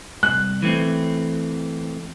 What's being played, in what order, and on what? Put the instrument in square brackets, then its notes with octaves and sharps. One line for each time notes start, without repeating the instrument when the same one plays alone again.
[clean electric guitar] C2 G#2 [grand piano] F#6
[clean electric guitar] E3 A3 C4